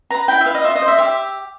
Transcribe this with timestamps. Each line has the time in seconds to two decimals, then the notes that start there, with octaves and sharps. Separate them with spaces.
0.10 B4 A#5
0.28 E4 G5
0.41 E5
0.45 B4 F5
0.55 D#5
0.64 F4 E5
0.75 D#5
0.82 C5
0.88 E5
0.99 G4 E5